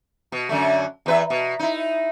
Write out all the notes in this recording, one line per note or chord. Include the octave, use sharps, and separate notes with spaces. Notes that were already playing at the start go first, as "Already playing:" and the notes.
B2
F#2 D3 A3
E2 B4 E5
B2
D#4 E4